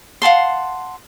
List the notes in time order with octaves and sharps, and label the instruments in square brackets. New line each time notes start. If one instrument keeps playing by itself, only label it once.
[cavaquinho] F5 F#5 A5 C6